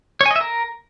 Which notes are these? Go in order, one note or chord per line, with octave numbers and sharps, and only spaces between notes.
C#5
G#5
D#5
E5
A#4